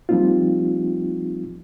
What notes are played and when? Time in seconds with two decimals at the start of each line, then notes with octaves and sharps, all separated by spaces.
0.09 F3 G3 A#3 C4 D#4 F4